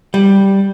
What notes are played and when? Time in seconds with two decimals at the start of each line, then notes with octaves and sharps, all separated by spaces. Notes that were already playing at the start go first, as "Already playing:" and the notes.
0.14 G3